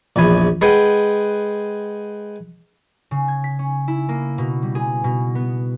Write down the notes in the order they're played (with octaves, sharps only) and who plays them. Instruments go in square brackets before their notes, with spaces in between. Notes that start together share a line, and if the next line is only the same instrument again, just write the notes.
[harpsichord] A#1 E2 G#5 B5
G#3 G#4 B4 F#5 G5
[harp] C#3
G#6
B6
C#4
E4
A#3
B2
G3
G#4
B2
B3